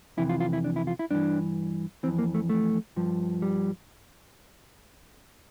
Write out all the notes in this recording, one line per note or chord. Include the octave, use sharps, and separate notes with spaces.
F2 C3 E3 E4
F4
F4
E4
D4
E4
F4
E4
G2 E3 D4
F2 E3 C4
A#3
A3
A3
G2 F3
G3